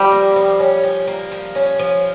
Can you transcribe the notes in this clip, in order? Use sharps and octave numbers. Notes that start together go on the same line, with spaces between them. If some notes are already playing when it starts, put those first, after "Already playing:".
Already playing: F3 G3
A#3
F3
C#4
F3
A#3
F3
C#4
F3